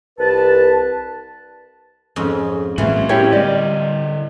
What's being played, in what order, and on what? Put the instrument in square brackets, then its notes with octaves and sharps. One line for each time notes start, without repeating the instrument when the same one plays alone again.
[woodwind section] C2 B4 A5
[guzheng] F2 G#2 C#4
[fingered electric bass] A2 G#3 A#3 [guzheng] E3 F4 [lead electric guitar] C#4 F#4
[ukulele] E4 G4 C#5 [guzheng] F4
[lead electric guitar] D3 D#5 [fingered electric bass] G3 [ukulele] D5